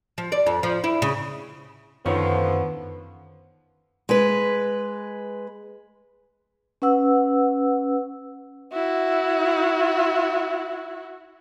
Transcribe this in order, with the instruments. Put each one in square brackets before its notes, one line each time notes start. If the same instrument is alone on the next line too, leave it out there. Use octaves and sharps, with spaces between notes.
[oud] F3
D5
F2
F3
E4
C#3
[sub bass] F#2 [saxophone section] D3 F3 [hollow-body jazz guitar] D#3 C#5 [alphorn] B3
[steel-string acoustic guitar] G#3 B4
[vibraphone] C#4 B4 F#5 E6
[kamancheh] E4 F#4